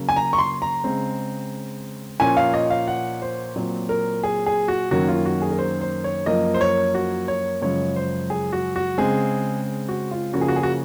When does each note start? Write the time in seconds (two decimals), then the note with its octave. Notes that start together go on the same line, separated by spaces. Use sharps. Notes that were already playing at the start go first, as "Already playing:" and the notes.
Already playing: C#3 F#3 A#3 C#4
0.09 G#5
0.16 A#5
0.33 C#6
0.38 C6
0.62 A#5
0.84 C#3 G#3 C4
2.20 A#2 F3 A#3 C#4 G#5
2.37 F5
2.54 D#5
2.70 F5
2.88 F#5
3.22 C5
3.56 A#2 F#3 C4
3.89 A#4
4.24 G#4
4.46 G#4
4.68 F#4
4.91 F#2 D#3 A#3 C#4 F#4
5.08 F4
5.26 F#4
5.42 G#4
5.51 A#4
5.58 C5
5.81 C5
6.04 C#5
6.26 F#2 F3 A#3 D#5
6.54 C5
6.61 C#5
6.95 F#4
7.28 C#5
7.62 F#2 C#3 F3 G#3 C#5
7.96 C5
8.30 G#4
8.53 F#4
8.76 F#4
8.98 C#3 G#3 C4 G#4
9.89 F#4
10.11 F4
10.33 C#3 F3 A#3 C#4 F#4
10.41 G#4
10.48 F#4
10.56 G#4
10.63 F#4